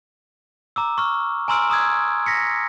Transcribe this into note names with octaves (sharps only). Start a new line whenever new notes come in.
A#5 D6 E6
C#6 F6
G#5 A#5 C6 E6 F6 D7
A#5 D#6 E6 G#6
A#6 B6 C#7